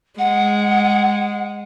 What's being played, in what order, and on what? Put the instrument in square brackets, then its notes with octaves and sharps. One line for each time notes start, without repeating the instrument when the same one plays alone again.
[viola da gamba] G#3 [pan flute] F#5